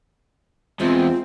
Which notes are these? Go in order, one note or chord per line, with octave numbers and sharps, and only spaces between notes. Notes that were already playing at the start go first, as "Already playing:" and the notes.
E2 G#3 C4 F4